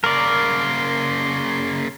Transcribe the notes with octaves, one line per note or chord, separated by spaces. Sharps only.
C#3 A#3 A#4 D5 C6